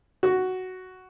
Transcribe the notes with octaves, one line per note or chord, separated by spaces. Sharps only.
F#4